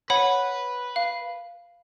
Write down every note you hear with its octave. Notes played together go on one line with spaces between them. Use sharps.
B4 C#5 F#5 B5
F5